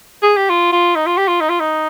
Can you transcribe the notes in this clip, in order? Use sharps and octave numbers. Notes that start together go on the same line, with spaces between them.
G#4
G4
F4
F4
D#4
F4
G4
F4
D#4
F4
D#4